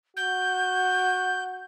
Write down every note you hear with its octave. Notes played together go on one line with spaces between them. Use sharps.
F#4 G6